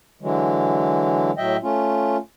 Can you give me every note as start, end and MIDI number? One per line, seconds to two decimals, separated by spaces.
0.22 1.31 50
0.22 1.31 52
0.22 1.31 54
0.22 1.31 56
1.37 1.57 45
1.37 1.57 54
1.37 1.57 75
1.37 1.57 76
1.37 1.57 79
1.63 2.17 57
1.63 2.17 61
1.63 2.17 65